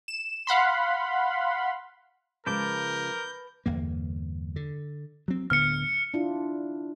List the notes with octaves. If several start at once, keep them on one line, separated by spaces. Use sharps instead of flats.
E7
F5 F#5 B5 C6
C#3 F3 G#3 A#4 B4 A5 D6 G6
G1 E2 A#3
D3
F#3 C4
D1 D3 B3 F6 C#7
D4 E4 F4